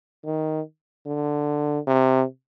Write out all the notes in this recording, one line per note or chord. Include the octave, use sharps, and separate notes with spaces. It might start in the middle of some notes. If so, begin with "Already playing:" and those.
D#3
D3
C3